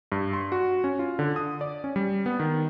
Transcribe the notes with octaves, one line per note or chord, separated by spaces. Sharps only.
G2
C6
F#4
C#4
F4
D3
D#6
D5
C#4
G3
B3
D#3